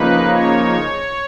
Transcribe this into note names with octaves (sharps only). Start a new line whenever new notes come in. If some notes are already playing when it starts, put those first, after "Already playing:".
Already playing: C#3 F3 A#3 D#4 B4
C#5